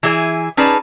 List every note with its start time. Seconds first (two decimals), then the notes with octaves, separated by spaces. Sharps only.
0.03 E3 E4 G#4 C#5 G#5
0.57 C#4 D#4 G#4 B4 D5 A5